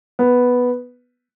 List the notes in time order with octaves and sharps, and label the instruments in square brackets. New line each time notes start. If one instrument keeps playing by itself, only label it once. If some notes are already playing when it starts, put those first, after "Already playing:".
[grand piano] B3